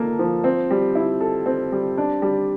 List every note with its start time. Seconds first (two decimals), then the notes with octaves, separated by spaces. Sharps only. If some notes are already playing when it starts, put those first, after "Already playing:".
Already playing: F3 A#3 A4
0.19 F3
0.44 C4
0.71 G3
0.95 E4
1.21 A4
1.46 C4
1.72 G3
1.98 D4
2.22 G3